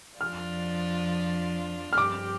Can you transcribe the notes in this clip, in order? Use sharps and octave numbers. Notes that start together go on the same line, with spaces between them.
F2 F3 D4 F4 D5 F6
F6
G2 F3 C4 G4 D6